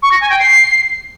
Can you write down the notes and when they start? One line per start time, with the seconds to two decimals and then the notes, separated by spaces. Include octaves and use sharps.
0.02 C#6
0.12 A#6
0.21 G#5
0.30 G5
0.39 C7